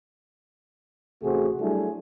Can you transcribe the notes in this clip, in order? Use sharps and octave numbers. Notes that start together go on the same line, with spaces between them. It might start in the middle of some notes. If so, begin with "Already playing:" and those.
A1 C3 A3 F#4 G#4 C5
F#3 G3 A3 D4 E4 G#4